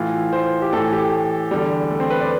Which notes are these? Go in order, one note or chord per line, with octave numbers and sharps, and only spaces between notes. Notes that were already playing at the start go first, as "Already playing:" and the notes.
Already playing: A2 E3 F4
C5
G4
A2 E3 A4
G4
E2 D3 G3
A3
C4
B4
D5